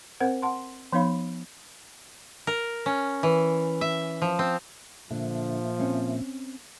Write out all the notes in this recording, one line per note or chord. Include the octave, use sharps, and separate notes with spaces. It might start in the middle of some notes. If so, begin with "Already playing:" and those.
C4 A#4 C5 F#5
F#5 A5 C6
F3 B3 D#4 C#5 F5 B5
A#4
C#4
E3
E5
F3
C4
A#2 D3 F3 A#3 E5
C4 C#4